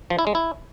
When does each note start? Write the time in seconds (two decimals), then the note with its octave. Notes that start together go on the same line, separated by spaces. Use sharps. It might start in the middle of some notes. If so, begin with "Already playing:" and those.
0.10 F3
0.19 E4
0.27 G#3
0.35 E4